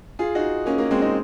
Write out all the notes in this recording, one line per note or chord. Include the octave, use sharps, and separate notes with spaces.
F4 G#4
D#4 F#4
A#3 C#4
A#3
G#3 C4
C4 D#4